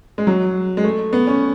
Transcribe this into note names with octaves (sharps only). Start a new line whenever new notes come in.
G#3
F#3
G#3
A3
B3
C#4